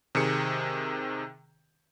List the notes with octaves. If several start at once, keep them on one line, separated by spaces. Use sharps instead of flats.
C3 D#3 G#4 C#7